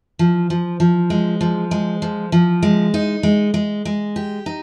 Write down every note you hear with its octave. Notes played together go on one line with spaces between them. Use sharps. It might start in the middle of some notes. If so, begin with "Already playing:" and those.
F3
F3
F3
G#3
F3
G#3
F3
F3
G#3
D#4
G#3
G#3
G#3
G4
D#4